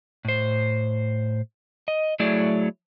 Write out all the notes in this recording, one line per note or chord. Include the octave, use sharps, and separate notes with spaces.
A2 C5
D#5
F#3 A3 E4 G#4 D5